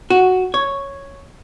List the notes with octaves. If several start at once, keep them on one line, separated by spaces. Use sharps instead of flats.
F#4
C#5